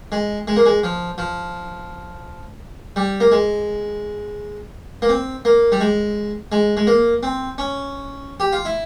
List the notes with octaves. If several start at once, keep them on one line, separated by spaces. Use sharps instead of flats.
G#3
G#3
A#3
G#3
F3
F3
G3
A#3
G#3
A#3
C4
A#3
G3
G#3
G#3
G#3
A#3
C4
C#4
G4
F4
E4